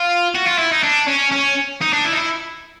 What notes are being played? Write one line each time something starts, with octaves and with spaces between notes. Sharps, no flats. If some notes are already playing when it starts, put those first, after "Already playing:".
Already playing: F4
F#4
F4
E4
D#4
D4
C#4
C#4
D#4
D4
E4
D#4
E4